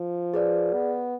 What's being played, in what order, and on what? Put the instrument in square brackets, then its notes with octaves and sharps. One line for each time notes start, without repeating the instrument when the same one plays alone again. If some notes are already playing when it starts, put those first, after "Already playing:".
Already playing: [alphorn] F3
[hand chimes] G#4 B4 D5
[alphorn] B3